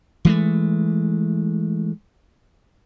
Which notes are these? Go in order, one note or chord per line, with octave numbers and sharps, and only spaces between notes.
E3 G#3 A3